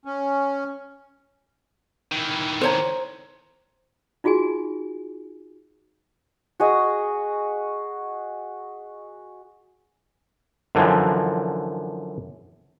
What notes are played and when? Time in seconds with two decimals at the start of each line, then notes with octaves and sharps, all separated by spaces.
0.05 C#4
2.12 D#3 E3
2.61 C5 C#5 A#5
4.24 D#4 F4 F#4 G#4 G#5
6.60 F#4 G#4 D#5
10.75 F#2 D3 E3 F3